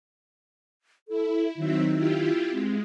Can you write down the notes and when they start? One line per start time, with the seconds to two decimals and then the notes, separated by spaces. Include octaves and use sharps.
1.08 E4 A4
1.56 D#3 F#3 C4 E5
1.94 E4 F4 G4
2.52 G#3 C4